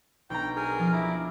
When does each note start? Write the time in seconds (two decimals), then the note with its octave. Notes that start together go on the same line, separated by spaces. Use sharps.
0.30 B1 D4 G5 A#5
0.56 G#4 A#4
0.79 F3 F4
0.92 E4 A#5 D6
1.08 D4